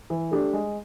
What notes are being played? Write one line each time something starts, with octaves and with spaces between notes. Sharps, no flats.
E3
A3 D4 G4
G#3